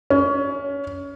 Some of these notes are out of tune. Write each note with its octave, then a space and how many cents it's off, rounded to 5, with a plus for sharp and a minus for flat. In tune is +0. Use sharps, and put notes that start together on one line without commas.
C#4 +25